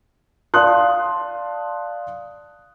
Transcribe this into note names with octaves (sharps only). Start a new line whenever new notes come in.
D5 F5 A5 C6 D#6 F#6